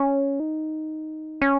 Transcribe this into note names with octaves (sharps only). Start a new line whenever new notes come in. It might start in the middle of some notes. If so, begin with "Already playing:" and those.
Already playing: C#4
D#4
C#4